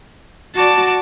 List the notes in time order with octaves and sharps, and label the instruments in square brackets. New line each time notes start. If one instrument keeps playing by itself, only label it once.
[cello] F#4 D5 [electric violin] A5 D6